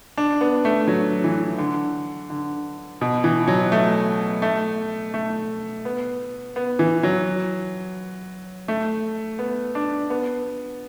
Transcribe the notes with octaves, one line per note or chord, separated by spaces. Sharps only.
D4
B3
A3
F#3
E3
D3
D3
B2
E3
F#3
A3
A3
A3
B3
B3
E3
F#3
A3
B3
D4
B3